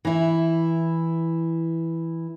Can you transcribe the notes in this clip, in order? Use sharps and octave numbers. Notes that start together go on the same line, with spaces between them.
E3 E4